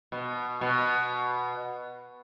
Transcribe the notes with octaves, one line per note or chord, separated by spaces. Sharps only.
B2
B2